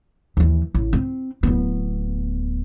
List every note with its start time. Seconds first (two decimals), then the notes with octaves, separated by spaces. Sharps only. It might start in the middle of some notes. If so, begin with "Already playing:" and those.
0.37 D#2 E3
0.74 A1
0.93 C4
1.43 D1 B3